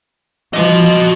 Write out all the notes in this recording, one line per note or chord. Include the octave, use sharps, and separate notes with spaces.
F3 F#4 D#5